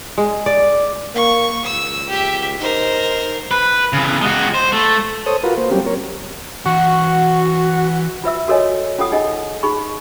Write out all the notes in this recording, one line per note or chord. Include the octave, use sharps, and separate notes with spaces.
G#3
D5
A#3 C#6
C#2 E6
G4 E5
D#4 A#4 C5
B4
C#3 E3
G#3 F#4
C5
A3
A4 C5 C#5 D#6
F4 F#4 A#4 B4
A#3 C5
F#3 G3 A#3 C4 C#4 G4
A#4 C#5
E3 F#4 F5
F4 B4 E5 E6
F#4 A4 A#4 C#5 D#5 G#5
C#4 F4 A4 F#5 D#6
D#4 G#4 D#5 F#5 G#5
D#4 G#4 B5 C#6